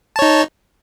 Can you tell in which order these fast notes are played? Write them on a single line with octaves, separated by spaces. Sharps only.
A5 C#5 D#4